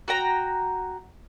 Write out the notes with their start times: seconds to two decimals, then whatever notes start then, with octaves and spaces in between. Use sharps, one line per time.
0.08 F#4 G5 A#5